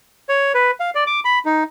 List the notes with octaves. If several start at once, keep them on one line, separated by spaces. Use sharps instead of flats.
C#5
B4
F5
D5
D6
B5
D#4